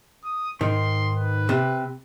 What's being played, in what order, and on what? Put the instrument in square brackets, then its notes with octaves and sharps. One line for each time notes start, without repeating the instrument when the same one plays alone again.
[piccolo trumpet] D#6
[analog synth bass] G#2 [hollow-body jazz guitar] D#3 [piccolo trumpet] C6
[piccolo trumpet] B4
[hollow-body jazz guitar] C3